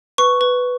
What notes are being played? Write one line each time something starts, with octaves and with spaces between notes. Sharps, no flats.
B4 C#6
B4